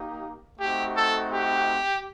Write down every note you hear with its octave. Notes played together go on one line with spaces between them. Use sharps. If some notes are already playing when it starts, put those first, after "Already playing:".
Already playing: A#3 D#4 G4
A3 C4 D#4 F#4 G4
A4
G4